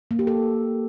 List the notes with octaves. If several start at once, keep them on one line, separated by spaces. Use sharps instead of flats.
A#3
G4
A4